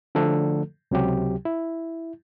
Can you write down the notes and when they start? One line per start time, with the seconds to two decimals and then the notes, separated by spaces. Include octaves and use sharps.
0.15 D3 F3 A3 A4
0.91 C#2 C3 F#3 G4
1.45 E4